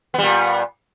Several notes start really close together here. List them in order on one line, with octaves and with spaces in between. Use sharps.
B3 G3 A#2